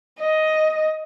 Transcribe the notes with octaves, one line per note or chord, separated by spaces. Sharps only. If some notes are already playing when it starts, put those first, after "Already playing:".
D#5